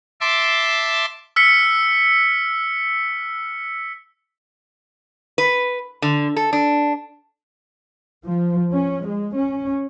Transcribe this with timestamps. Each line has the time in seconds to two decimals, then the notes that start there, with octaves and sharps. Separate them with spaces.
0.21 E5 A5 C6 D6
1.36 E6 F6 B6 C#7
5.38 B4
6.02 D3
6.36 A4
6.53 D4
8.25 F3
8.71 C#4
9.04 G#3
9.35 C#4